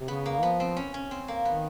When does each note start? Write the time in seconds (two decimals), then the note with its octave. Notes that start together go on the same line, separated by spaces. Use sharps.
0.01 C3
0.08 C#3 B3
0.26 A#3
0.43 F3 B3
0.60 C4
0.77 C#4
0.94 C#4
1.11 C4
1.28 A#3
1.45 D#3 B3